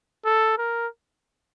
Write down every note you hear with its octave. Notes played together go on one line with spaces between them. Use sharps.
A4
A#4